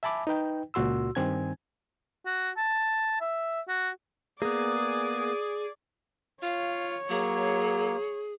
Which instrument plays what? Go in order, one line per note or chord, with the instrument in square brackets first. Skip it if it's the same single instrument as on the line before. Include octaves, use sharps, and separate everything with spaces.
[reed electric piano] E5 G#5 A5 B5 D6
D#4 B4 G5
C#2 A#2 F#4 C6 E6
G2 D#3 C4 G#5 G#6
[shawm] F#4
A5
E5
F#4
[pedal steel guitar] A#3 B3 [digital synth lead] G#4 [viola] D5 [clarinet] D#6
[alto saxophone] F4 [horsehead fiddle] C#5 [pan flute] F5
[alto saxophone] F#3 [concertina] A#3 [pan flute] G#4